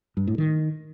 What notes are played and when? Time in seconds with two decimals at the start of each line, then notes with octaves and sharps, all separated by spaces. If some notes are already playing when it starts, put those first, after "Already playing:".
0.17 G2
0.27 A2
0.38 D#3